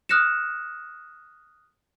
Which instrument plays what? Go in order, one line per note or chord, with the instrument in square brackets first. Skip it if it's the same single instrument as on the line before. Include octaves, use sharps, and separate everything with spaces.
[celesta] D#6 F6 F#6 A#6 C#7 E7